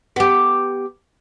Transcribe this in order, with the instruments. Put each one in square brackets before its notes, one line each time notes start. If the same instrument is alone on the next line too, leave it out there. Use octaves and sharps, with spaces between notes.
[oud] B3 G4